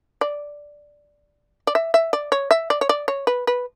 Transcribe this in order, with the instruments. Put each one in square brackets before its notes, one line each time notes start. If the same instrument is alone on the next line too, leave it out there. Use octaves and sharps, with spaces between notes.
[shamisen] D5
D5
E5
E5
D5
C#5
E5
D5
C#5
D5
C#5
B4
B4